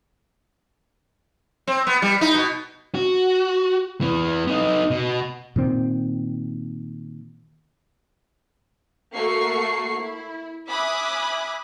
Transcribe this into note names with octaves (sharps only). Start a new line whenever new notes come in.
C4
B3
G3
D#4
B2
F#4
E3 B3
B3 D#4
B2
A#2 D#3 C4
A3 A#3 F#4 C#6 C7
E4
E5 G#5 B5 D6 D#6 F#6